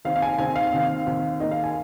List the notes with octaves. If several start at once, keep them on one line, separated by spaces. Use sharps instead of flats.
D#2 D#3 C4 F5
F5
G#5
D#2 D#3 C4 G#5
F5
D#2 D#3 C4
D#2 D#3 C4
D#2 D#3 A#3 D#4 D#5
F5
G#5